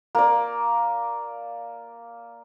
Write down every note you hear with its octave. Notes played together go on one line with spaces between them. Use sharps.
A#3 D5